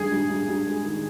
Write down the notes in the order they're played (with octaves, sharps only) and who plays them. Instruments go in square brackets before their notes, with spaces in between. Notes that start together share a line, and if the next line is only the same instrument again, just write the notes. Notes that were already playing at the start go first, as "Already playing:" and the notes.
Already playing: [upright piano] G2 D#3 G#3 [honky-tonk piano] G#4
[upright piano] G2
G2
G2
G#3
D#3